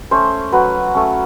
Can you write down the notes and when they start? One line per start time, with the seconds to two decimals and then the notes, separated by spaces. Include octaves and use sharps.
0.11 A3 C#4 C5
0.52 F#3 B4
0.94 A3 C#4